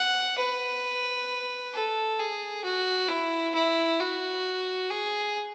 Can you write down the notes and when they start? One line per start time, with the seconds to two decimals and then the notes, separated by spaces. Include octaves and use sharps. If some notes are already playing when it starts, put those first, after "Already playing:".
Already playing: F#5
0.38 B4
1.73 A4
2.19 G#4
2.64 F#4
3.09 E4
3.54 E4
4.00 F#4
4.90 G#4